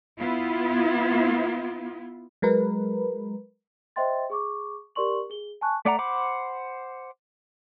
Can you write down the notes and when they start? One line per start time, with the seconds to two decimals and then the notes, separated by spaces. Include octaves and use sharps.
0.19 B3 E4 F4
2.42 F#3 G#3 A#4 B4
3.96 C5 D#5 E5 G5 C6 A6
4.30 G#4 C#6 D6
4.96 G4 A#4 D5 C6 C#6 F#7
5.30 G#4 G7
5.61 G#5 A5 C#6 F#6
5.85 A3 D5 F#5 A#5
5.99 C5 F#5 B5 D6